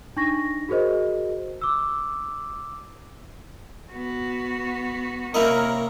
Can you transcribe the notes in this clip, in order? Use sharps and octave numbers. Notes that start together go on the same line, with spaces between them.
D4 D#4 C#6 A#6
F#4 G#4 A#4 C5 D#5
D6 E6
B3 F#4
C3 A#3 C#4 E4 A#4 D#5